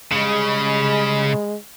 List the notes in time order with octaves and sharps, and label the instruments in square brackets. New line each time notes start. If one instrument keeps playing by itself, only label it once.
[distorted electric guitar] C#3 [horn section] G3 D#5 B5 [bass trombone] G#3